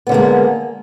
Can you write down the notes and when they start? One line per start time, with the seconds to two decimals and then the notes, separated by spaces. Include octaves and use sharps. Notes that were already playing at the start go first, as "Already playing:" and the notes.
0.07 B3
0.09 D3
0.12 A#3
0.14 G#3